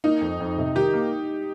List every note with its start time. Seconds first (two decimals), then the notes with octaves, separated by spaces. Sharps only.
0.04 A#3 D#4
0.21 F2
0.40 F2
0.58 C3
0.75 D#3 G4
0.93 A#3